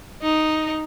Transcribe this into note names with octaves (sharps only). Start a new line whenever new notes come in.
D#4